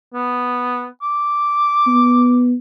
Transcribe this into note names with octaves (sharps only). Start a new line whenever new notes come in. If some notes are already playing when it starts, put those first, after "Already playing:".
B3
D6
B3